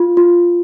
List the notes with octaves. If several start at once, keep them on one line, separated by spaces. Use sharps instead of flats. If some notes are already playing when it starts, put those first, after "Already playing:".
Already playing: F4
F4